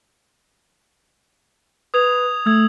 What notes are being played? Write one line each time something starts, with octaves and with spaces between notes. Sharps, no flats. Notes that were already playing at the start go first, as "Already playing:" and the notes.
B4 D#6 G#6 F7
A3 D#6 E6 G#6